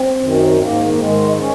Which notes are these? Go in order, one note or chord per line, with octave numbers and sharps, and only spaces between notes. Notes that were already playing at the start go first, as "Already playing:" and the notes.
Already playing: C4
F#2 D#3
G#2 D#3 A#3
A#3
G#2 D#3 G#3
C#4